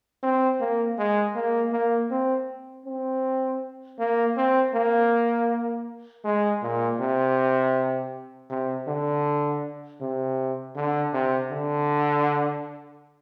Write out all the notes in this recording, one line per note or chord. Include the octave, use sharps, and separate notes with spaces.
C4
A#3
G#3
A#3
A#3
C4
C4
A#3
C4
A#3
G#3
A#2
C3
C3
D3
C3
D3
C3
D3